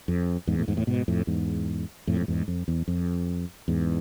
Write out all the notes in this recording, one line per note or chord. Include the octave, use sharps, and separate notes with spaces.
F2
E2 G#2
A2
E2 G#2
A2
G#2 B2
F2 A2
E2 G#2
F2 A2
A2
E2 G#2
F2
E2
F2
E2 G#2